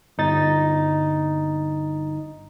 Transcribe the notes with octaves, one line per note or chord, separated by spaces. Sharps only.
G1 D#4 A6